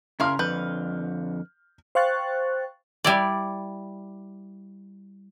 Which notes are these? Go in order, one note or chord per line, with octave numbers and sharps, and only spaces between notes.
C#3 E4 A#4 F5 A#5 C6 F6
F2 D3 B4 G6
C5 F5 G5 C#6 F#6 A6
G3 E4 D5